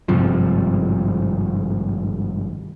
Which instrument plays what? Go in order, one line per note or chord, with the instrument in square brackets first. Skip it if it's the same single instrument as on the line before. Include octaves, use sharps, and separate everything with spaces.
[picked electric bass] G#1 G2 C3 F3